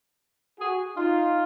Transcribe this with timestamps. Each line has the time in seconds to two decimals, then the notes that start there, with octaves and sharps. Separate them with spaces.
0.60 F#4 G#4
0.97 D#4 F4